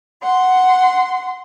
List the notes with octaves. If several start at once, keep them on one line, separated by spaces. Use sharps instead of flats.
F#5 C6